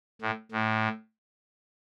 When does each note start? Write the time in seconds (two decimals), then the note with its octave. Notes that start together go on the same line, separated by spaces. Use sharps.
0.22 A2
0.52 A2